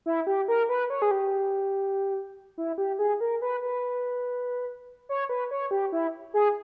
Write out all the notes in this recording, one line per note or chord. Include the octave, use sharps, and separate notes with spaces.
E4
G4
A#4
B4
C#5
G#4
G4
E4
G4
G#4
A#4
B4
B4
C#5
B4
C#5
G4
E4
G#4